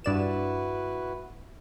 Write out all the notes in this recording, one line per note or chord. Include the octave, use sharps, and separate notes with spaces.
G2 E4 F#4 B4 D5 E7